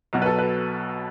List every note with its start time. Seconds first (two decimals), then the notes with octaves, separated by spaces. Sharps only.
0.13 B1 B2 F#3 F#4
0.22 B4
0.26 A4
0.39 B4